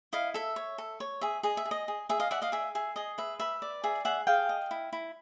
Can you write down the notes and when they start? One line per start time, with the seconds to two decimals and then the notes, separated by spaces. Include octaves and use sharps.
0.13 E4 D#5 F5
0.34 A4 E5
0.56 C#5
0.78 A4
1.00 C#5
1.21 G#4 E5
1.43 G#4 D#5
1.57 E5
1.66 G#4
1.71 D#5
1.88 G#4
2.09 G#4 E5
2.20 D#5 F5
2.31 D5 E5 F#5
2.42 D#5 F5
2.52 G#4 E5
2.75 G#4 E5
2.96 G#4 D#5
3.18 B4 E5
3.40 B4 E5
3.62 D5
3.84 G#4 E5
4.05 G#4 E5 F#5
4.27 G#4 F5 G5
4.49 D#5
4.71 E4
4.93 E4